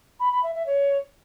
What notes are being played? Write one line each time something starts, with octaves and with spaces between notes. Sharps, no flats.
B5
B5
E5
E5
C#5